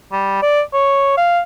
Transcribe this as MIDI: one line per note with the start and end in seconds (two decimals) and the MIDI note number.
0.12 0.41 55
0.42 0.61 74
0.74 1.12 73
1.17 1.40 77